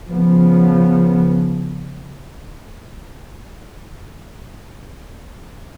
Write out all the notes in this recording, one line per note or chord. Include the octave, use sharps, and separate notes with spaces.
C#3 F3 B3